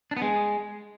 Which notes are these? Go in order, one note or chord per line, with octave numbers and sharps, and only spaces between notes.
D4
B3
G#3